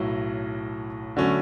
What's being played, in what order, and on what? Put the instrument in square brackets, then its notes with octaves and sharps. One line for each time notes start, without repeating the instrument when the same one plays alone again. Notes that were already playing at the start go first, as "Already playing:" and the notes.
Already playing: [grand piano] B1 A2 F#3
D3 F#3 A3 C#4